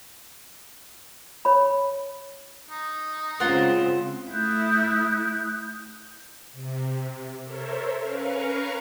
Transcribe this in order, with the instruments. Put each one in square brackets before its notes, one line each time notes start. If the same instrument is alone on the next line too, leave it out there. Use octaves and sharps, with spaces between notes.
[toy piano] C#5 B5
[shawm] D#4
[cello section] C#3 G#3 C4 [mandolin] F4 C5 F#5
[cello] A3 E4 [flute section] D#6 F#6 G6
[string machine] C3
A4 A#4 C5 C#5 E5
C#4 A#4 B4 F5 A#5 C#6